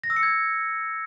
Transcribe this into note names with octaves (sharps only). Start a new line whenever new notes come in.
A#6
E6
C#7
G#6